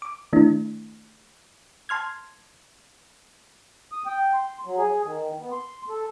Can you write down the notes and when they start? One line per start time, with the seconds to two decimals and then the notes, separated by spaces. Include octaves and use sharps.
0.02 D6
0.33 D#3 A3 D4 E4
1.89 A5 C6 F6 G#6
3.92 D#6
4.06 G5
4.34 C6
4.65 F#3
4.79 G#4
5.05 D#3
5.39 B3
5.52 C6
5.89 A4